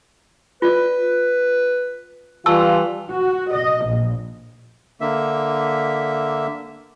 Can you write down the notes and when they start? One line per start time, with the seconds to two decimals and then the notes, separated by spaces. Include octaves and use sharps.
0.62 F4 B4 D5
2.46 E3 G3 F4 A5 C#6 E6
3.10 F#4
3.53 D#5
3.86 A#1
5.01 D3 A#3 E5